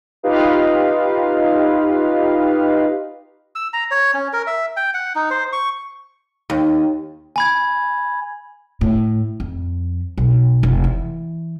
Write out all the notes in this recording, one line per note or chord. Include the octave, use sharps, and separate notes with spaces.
D#4 F4 G4 B4 D#5 F5
E6
A#5
C#5
C#4
A#4
E5
G5
F#5
D#4
C5
C#6
D#2
G#5 B5 G#6
A2
F2
B1
F1
E3